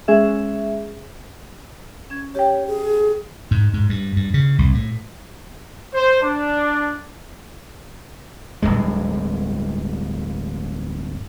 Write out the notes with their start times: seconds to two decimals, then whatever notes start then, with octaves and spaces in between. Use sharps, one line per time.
0.08 G#3 C#4 G#4 E5
2.10 C#4 G#6
2.35 G4 C#5 G5
2.68 G#4
3.51 G#2
3.74 G#2
3.89 G2
4.16 G2
4.34 C#3
4.58 C2
4.74 A2
5.94 C5
6.22 D4
8.62 D1 A#1 G2 G#3